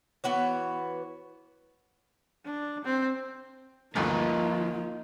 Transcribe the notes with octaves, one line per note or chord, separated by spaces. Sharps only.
E3 B3 F#4 C#5
D4
C4
A1 D2 G2 F3 A#3 D#4 F4 B4